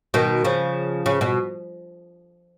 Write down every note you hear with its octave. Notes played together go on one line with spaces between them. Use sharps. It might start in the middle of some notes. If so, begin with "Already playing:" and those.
B2 D#3
C#3 F3
C#3
B2